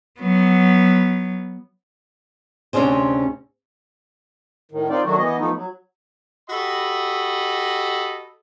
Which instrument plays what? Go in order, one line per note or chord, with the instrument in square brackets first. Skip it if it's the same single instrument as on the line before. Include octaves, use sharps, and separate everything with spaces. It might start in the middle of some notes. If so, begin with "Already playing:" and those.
[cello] F#3 B3
[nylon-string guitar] D2 C3 C#4 D4 G#4 C5
[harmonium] A2 D#3
C4 D#4 F4 D5
D#3 F#3 A3 D4 F#4
E3 B3 D#5
F3 A3 B3 D#4
F#3
[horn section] F#4 G4 A4 D#5 B5